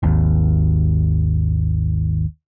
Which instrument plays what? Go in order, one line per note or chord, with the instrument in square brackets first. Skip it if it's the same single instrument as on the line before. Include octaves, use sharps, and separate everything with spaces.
[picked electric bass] G#1 D#2